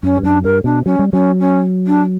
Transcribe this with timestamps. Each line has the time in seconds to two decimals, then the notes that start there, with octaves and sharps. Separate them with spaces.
0.03 F#2 C#4
0.17 G2
0.23 F#2 D4
0.44 G2 A#4
0.64 B2 D4
0.86 F#3 C#4
0.99 G3
1.12 F#3 C#4
1.40 C#4
1.87 D4